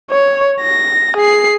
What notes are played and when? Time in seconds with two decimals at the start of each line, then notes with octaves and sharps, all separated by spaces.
0.10 C#5
0.61 A#6
1.16 G#4 C7